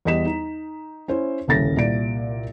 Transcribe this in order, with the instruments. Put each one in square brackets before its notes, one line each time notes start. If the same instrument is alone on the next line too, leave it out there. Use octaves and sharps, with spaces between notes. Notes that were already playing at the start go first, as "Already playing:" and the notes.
[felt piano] E2 G3 D#5 B6 E7
D#4
C#4 E4 C5
D#1 C2 C#3 A4 A6 A#6
C2 A#2 D5 D7